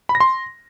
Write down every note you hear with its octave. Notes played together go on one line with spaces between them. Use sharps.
B5
A#6
C6